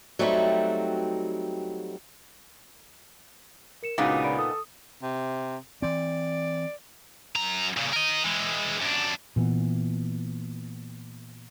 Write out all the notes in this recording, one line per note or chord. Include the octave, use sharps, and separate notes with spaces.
F#3 G3 A3 C4 D#4 F#4
A#4 C#7 E7
C#2 A#2 C#3 B3 D#4 F#4 D6 D#6
D5 B5 D7
A4 D#6
C3
E3 C4 D5
F#2 A#5
A#2 C#3
A#4 D#5
E3 G#3
F#2 D4
A#2 E3 B3